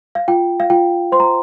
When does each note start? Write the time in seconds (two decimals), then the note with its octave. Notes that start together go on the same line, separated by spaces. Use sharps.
0.15 F5
0.28 F4 G5
0.60 F5
0.70 F4 G5
1.12 C5 C6
1.20 A#5